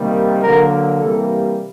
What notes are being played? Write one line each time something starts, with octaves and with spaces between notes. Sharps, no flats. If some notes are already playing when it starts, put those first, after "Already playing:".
Already playing: C3 D#3 G3 A#3
D3 F#3 A#3 A#4
C3 E3 G3 A#3 A4